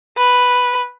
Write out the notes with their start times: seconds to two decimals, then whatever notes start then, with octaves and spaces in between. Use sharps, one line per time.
0.17 B4